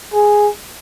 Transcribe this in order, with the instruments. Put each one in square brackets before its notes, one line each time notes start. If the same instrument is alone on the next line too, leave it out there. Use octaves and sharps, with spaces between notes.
[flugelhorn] G#4